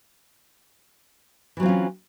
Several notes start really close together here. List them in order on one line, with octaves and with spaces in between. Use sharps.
E3 F#3 C4 F4 C#4